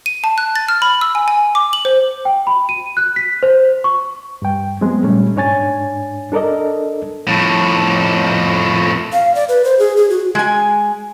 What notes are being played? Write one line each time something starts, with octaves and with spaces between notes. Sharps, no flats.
D#7
A5
F#6
A6
F6
B5
E6
G#5
G#5
D6
F#7
C5
G5
B5
D#7
F#6
B6
C5
C#6
G2 G5
F#3 G#3 B3 C4
A#2 G3 A3 C#4
G#2 D4 C#5 G#5 A6
D4 A4 A#4 D5 D#5
F2 A2
F5
D5
B4
C5
G#4
G#4
F#4
G#3 G#5